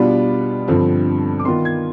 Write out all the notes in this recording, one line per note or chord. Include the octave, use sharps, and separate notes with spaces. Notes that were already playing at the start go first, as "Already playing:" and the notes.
Already playing: B2 G3 B3 D4 F4 B5
G2 D3 F3 C4
D6
D#3 B3 F4 C6
G#6